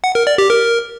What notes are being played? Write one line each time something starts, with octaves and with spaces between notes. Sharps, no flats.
F#5
A#4
D5
G4
A#4